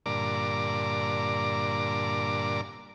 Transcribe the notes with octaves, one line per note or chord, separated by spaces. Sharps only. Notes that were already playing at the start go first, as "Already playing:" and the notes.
G2 A#2 D3 D5 A#5 D6